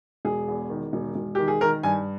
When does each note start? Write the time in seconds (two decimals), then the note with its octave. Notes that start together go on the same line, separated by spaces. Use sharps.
0.25 E1 G#4
0.48 E2
0.70 D#3
0.93 E1
1.15 E1
1.35 D#3 G4
1.48 G#4
1.61 D#3 A#4
1.83 G2 G#5